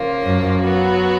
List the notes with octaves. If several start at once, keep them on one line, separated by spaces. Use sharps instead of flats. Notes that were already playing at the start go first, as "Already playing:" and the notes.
Already playing: C#3 F3 A#3 F4
F#2
F#3 B3 F#4